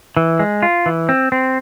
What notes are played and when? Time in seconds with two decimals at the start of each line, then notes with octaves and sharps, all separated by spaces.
0.17 E3
0.39 G#3
0.63 F4
0.86 E3
1.09 C4
1.32 C4